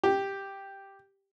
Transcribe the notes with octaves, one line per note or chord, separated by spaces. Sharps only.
G4